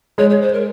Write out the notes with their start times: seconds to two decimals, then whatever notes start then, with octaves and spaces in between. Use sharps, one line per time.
0.18 G#3 C#5
0.30 C#5
0.42 C5
0.53 A#4